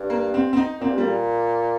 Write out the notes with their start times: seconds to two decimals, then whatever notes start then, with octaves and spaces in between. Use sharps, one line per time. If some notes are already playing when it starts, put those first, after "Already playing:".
Already playing: G2
0.10 A#3
0.34 C4
0.53 C4
0.57 D#4
0.80 A#2 C4
0.90 G2
0.98 A#2 G3